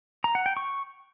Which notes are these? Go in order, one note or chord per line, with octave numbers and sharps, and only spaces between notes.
A#5
F#5
G5
C#6